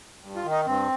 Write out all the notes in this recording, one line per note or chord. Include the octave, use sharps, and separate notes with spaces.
G2
F4
D#3
D#4
G2 C4